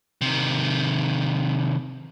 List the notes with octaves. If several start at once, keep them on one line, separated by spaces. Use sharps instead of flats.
C3 D#3